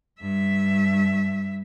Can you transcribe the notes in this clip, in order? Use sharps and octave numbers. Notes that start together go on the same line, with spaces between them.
G2 E5